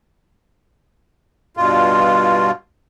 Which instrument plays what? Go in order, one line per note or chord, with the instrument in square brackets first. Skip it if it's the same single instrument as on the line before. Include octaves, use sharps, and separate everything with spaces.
[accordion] G2 B2 F4